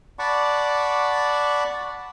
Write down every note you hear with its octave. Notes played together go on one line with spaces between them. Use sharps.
D5 F#5 A5 B5 C#6 D6